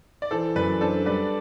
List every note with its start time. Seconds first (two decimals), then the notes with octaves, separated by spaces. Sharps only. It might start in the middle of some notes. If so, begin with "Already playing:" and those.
0.22 D5
0.31 E3 A4 C5
0.55 F#2 B4 D5
0.80 D4 A4 C5
1.06 G3 B4 D5